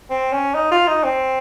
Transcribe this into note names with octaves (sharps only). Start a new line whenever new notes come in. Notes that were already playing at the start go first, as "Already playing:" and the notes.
C4
C#4
D#4
F4
D#4
C4